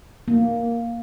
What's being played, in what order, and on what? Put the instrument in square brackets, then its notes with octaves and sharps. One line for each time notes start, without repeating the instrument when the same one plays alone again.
[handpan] A#3